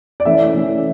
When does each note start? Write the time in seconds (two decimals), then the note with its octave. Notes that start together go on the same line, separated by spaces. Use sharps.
0.20 D5
0.25 E3 A3 C#4 E5
0.54 E3 A3 C#4